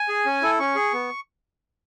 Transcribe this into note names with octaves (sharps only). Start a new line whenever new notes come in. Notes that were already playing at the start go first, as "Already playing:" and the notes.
Already playing: G#5
G#4
C#4
E4 A4
C#4 C#6
G#4
B3